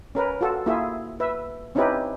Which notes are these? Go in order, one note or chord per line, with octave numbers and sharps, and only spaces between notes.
C#4 A#4 B4
F4 F#4 A4
A#3 E4 F4 G#4 E5
B4 E5
C4 C#4 D#4 E4 G4 B4